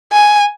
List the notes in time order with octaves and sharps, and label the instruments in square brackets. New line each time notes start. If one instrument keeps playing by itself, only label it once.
[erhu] G#5